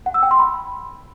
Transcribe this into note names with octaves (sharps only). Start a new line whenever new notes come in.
F#5
E6
G5
C6
B5